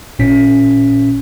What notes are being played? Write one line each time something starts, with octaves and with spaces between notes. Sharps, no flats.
A1 A#2 C#4 B6